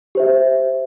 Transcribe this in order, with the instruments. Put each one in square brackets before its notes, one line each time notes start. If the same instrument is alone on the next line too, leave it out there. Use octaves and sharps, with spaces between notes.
[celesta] G4 C5 E5